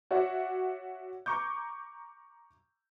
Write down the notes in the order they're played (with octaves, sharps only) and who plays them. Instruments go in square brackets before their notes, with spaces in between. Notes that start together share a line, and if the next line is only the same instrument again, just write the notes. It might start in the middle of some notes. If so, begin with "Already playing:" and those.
[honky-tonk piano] F#4 C#5 D5 E5 F#5
A#5 C#6 D6 G6